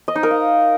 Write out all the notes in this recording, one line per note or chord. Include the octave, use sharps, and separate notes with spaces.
D#5
D#4
A#4
F5